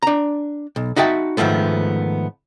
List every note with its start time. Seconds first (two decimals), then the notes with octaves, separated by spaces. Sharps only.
0.02 D4 A#5
0.76 B1
0.96 D#4 F#4 E5 G5 A5
1.37 G#2 D#3 F3 A3 B3